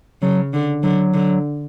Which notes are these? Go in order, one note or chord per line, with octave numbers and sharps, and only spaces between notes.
C#3 F#3
D3
D3 F#3
D3